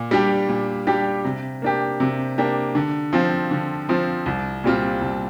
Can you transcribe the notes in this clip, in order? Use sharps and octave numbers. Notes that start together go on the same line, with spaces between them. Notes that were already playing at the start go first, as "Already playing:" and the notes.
Already playing: A#2
G3 D4 G4
A#2
G3 D4 G4
C3
A#3 D4 G4
C3
A#3 D4 G4
D3
F3 C4 F4
D3
F3 C4 F4
C2
A#2 G3 C4 F4
C2